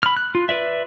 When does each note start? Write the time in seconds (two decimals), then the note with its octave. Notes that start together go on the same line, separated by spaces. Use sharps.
0.03 B5 F6
0.17 F#6
0.35 F4
0.49 B4 D5 E5